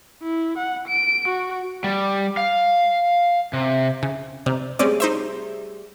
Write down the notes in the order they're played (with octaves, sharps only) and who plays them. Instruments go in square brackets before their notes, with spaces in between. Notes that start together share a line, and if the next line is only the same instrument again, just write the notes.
[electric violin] E4
F#5
D7
F#4
[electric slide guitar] G3
F5
C3
[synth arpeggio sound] C#3
[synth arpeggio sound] C3 [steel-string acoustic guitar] D5 A#5
[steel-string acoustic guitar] G3 A3 G#4 [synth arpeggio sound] C4 C#4 D5
[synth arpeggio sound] D#4 C5 E5